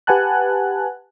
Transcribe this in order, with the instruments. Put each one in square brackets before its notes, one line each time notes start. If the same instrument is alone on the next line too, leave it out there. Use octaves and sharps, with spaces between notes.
[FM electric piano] G4 B4 F#5 G#5 A5 F#6